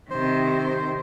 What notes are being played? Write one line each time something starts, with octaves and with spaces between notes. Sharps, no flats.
C3 D#3 C5